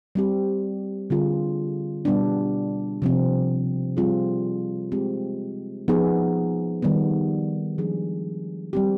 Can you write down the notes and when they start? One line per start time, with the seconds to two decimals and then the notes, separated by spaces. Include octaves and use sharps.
0.15 G3 C4 G4
1.10 D3 G3 C4 F4 G#4
2.05 B2 G3 B3 D4
3.02 C3 F3 C4
3.97 G3 C4 F4 G#4
4.92 G#3 C4 G4
5.88 F3 B3 D#4 G#4
6.82 D#3 G3 B3
7.78 F3 G#3 D4 G#4
8.73 G3 C4 G4